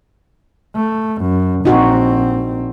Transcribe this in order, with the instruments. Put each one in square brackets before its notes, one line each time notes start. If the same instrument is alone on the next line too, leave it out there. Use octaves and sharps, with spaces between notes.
[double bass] A3
F#2
[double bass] A#1 C4 [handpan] D#4 F#4